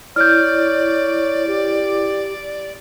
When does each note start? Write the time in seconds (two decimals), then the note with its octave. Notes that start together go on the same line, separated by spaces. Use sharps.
0.16 E4 C#5 D5 F6 G6
1.47 G4